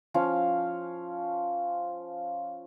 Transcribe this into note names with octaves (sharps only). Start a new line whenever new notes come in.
F3 C#4 F5